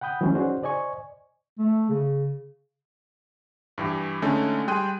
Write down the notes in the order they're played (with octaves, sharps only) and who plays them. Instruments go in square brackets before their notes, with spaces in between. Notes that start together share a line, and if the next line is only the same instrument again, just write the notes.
[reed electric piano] F#5 G5 B5 D#6 G6
E3 F#3 G3 A3 C#4
C#4 D#4 F#4 G#4 C5 D5
C5 D5 D#5 G#5 C#6
[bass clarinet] A3
C#3
[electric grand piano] G2 E3 G4
D3 G#3 A3 C#4 D#4
G3 G#4 G5 C6 F#6 D#7